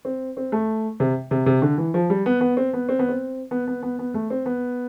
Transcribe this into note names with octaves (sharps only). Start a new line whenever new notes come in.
C4
C4
A3
C3
C3
C3
D3
E3
F3
G3
B3
B3
C4
B3
C4
B3
C4
B3
B3
B3
B3
A3
C4
B3